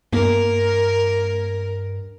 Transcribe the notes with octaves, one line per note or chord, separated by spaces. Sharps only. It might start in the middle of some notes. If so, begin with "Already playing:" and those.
G2 A#3 A#4